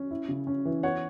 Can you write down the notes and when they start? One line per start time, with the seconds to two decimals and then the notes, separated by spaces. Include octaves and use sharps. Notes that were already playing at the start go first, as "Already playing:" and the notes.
Already playing: C#4
0.11 E4
0.29 C#3
0.47 C#4
0.65 E3
0.83 B3 C#5 F#5